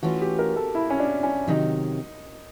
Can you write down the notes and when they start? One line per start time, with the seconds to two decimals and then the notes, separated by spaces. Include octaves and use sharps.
0.03 E3 A3 C#4 F4 F#4
0.21 G4
0.39 A#4
0.56 A4
0.75 E4
0.90 C#4
0.99 D4
1.23 C#4
1.47 C3 D#3 F#3 D#4